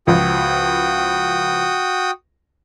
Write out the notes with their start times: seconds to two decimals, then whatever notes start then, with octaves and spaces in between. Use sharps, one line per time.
0.07 C#2 F3 F#4 G5 D#6